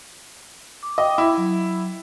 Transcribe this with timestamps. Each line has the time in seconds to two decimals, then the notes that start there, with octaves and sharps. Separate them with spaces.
0.83 D6
0.98 D#5 G5 D6
1.18 E4
1.37 F#3